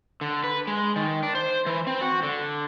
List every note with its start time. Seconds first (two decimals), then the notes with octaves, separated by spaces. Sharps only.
0.21 D3
0.44 B4
0.67 G#3
0.96 D#3
1.23 D4
1.35 C5
1.66 E3
1.87 C4
2.01 F#4
2.23 D3